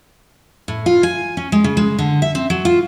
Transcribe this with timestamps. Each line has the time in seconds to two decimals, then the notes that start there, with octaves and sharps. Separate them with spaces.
0.68 A2
0.86 F4
1.03 G#5
1.37 C#4
1.52 G#3
1.64 C#3
1.77 G#3
1.99 D3
2.22 E5
2.35 C4
2.50 F#3
2.65 F4